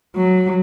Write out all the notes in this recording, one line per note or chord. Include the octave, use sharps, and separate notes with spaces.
F#3